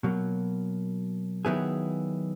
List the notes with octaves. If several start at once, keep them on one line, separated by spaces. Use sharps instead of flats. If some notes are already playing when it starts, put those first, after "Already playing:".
B2 F#3 A#3
D#3 F#3 B3 E4 G#4